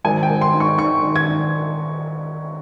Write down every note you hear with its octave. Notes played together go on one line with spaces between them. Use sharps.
G#1 G#5
G5
G#1
C6
G#2
C#6
D#3 C#6
D#3
G#6
D#3